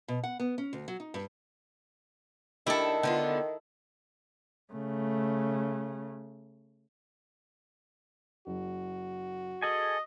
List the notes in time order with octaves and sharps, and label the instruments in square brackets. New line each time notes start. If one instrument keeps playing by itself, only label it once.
[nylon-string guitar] B2
F#5
B3
C#4
D2
F#3
D#4
G2
[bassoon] D#3 [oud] D4 G4 [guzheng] E4 A4
[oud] D3 B3 F4
[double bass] C#3 A3
[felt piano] F#1 [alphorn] F#4
[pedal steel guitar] G#4 A4 G#5 [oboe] D#5